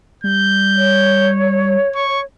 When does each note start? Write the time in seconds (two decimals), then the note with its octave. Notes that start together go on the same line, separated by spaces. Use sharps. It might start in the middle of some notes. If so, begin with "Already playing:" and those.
0.24 G3 G6
0.75 C#5
1.95 C#6